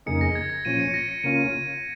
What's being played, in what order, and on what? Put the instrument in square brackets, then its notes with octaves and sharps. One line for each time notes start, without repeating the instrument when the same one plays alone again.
[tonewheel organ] F2 C#3 A#3 D#4 G#4 [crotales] C#7
[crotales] A#6
G#6
A#6
[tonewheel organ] A#2 F3 C#4 [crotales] D#7
[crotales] C#7
A#6
C#7
[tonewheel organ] C#3 A#3 C#4 F4 [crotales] D#7